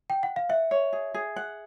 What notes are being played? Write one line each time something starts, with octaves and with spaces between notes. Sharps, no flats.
G5
F#5
F5
E5 F#5
C#5
G#4
G#4
F#5